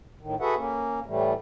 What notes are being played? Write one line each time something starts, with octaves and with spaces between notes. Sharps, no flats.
A2 D#3
F#4 G#4 A4 B4 E5 F#5
A#3 C#4
A2 E3 G3 A3